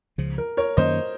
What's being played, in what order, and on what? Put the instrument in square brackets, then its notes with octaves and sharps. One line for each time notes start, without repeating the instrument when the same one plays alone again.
[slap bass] C#2 C#3 F3
[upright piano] A#4
A#4 C#5
[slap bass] F#2 D#3 A#3 C#4 [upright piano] C5 D#5